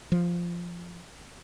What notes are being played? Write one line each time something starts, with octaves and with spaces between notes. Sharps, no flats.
F3